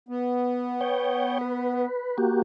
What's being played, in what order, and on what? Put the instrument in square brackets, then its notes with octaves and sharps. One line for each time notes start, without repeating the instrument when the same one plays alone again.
[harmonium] B3
[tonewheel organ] C#5 G5
B4
A#3 F#4 G4